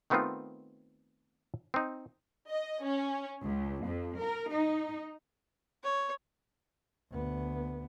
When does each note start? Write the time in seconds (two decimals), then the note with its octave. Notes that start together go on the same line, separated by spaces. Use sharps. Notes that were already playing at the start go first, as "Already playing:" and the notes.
0.10 D#3 A3 B3 C4 D#4 F4
1.74 C4 D#4
2.52 D#5
2.85 C#4
3.42 C#2
3.84 F2
4.19 A#4
4.51 D#4
5.83 C#5
7.11 D2 B3